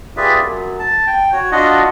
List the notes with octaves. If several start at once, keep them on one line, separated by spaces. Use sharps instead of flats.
F4 G4 G#4 B4 D5 E5
F#2
A5
G5
F#4 C#5
D4 F4 F#4 D#5 F#5